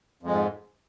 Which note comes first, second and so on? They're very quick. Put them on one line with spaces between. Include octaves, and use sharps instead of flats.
F2 G#3 G#2